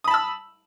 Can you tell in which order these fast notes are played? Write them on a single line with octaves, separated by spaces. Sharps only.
D#6 B5 A5 E6